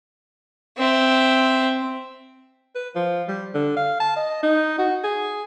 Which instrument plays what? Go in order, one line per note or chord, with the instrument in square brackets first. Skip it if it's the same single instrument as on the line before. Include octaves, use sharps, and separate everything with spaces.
[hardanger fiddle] C4 E5
[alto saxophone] B4
F3
G3
D3
F5
A5
D#5
D#4
F#4
G#4